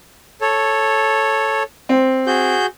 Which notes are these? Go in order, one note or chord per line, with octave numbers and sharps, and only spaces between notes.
A4 C#5
C4
F#4 G#4 G6